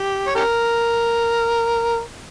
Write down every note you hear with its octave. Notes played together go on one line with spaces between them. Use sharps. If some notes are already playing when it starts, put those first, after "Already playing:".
Already playing: G4
C#5
C#4 G4 A#4